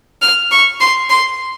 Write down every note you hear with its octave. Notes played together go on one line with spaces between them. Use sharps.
F6
C#6
C6
C6